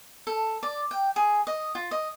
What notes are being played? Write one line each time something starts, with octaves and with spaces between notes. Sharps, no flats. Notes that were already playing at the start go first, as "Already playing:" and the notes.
A4
D5
G5
G#4
D#5
F4
D#5